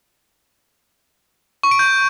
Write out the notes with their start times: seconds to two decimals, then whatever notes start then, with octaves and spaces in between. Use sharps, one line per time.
1.63 C#6
1.71 D7
1.79 G6